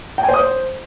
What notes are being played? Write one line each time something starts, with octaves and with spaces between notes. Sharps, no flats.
G5
G#5
C5
D#6
C5